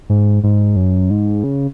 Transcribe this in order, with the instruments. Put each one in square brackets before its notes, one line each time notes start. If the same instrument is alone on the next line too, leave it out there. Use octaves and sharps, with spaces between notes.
[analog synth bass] G#2
G#2
F#2
G#2
C#3